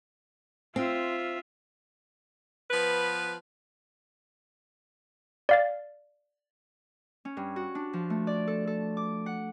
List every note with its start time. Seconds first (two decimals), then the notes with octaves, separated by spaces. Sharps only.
0.76 C4 F4 E5
2.70 F3 B3 B4
5.49 D5 F5 A6
7.25 C#4
7.37 G2
7.56 F#4
7.75 D4
7.93 F3
8.10 A3
8.27 D5
8.47 A4
8.67 A4
8.97 D6
9.26 F#5